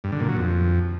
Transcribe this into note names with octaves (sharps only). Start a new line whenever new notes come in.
G2
D3
A#2
F#3
F2